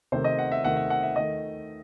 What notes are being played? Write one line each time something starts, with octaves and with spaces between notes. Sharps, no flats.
C3 D#3 A3 C5
D#5
F#5
E5
C3 D#3 A3 F#5
E5
F#5
E5
D#3 A3 D#5